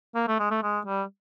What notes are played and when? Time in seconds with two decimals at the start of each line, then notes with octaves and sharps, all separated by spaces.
0.15 A#3
0.28 A3
0.39 G#3
0.51 A3
0.63 G#3
0.86 G3